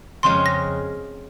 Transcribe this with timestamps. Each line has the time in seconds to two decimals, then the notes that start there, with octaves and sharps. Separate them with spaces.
0.23 F2 C#3 G#3 C6
0.46 A#6